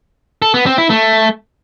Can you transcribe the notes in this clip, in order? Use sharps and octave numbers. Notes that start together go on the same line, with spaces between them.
A4
B3
C4
E4
A3